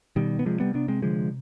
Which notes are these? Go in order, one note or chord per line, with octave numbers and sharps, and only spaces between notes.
B2 D#3 G3
B3
C3 F3 G#3
G3 B3
C3 B3 D4
G#3 C4
D3 F3 G#3